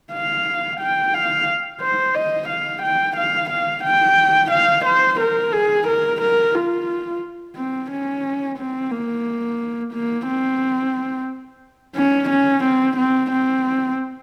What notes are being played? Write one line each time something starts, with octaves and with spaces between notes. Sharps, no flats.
F5
G5
F5
C5
D#5
F5
G5
F5
F5
G5
F5
C5
A#4
G#4
A#4
A#4
F4
C4
C#4
C4
A#3
A#3
C4
C#4
C#4
C4
C4
C4